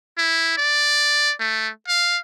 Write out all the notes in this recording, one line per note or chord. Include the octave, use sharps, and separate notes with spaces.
E4
D5
A3
F5